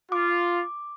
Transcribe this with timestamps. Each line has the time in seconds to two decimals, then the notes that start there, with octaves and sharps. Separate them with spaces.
0.12 F4 D6